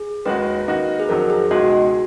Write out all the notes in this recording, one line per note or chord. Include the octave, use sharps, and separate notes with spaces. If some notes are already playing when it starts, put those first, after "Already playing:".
Already playing: G#4
D#2 D#3 G#3 D#4 F#4 B4
D#3 A#3 D#4 F#4
G#4
F2 D#3 F#3 A#4
G#4
C#2 B2 G#3 D#4 F#4